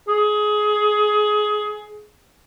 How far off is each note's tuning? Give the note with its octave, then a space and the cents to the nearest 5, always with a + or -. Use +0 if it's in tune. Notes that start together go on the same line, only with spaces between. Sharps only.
G#4 +20